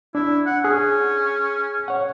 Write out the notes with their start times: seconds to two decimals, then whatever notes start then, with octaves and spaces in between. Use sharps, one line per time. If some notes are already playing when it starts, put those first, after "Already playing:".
0.15 D4 E4
0.46 F#5
0.64 C#4 G#4
1.88 C#5 F#5